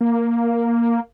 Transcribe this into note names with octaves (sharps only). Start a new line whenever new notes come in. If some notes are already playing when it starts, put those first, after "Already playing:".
A#3